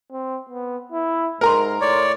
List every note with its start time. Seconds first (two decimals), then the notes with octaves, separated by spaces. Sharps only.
0.12 C4
0.49 B3
0.92 E4
1.41 G#2 A#4 A#5 C6
1.81 A2 C#5 D5